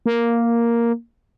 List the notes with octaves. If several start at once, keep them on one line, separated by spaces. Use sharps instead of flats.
A#3